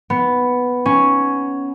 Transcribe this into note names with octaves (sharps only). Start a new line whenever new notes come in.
B3
C#4